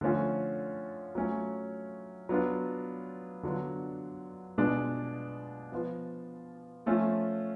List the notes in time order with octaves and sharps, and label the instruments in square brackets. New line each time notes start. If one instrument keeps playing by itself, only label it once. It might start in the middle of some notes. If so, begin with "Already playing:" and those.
[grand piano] D3 F3 A3 C#4 F4
F#3 A3 C#4 F4
F#3 B3 D4 F4
D3 F#3 B3 D4 F4
B2 G#3 D4 F4
F3 B3 F4
F3 A3 C#4 F4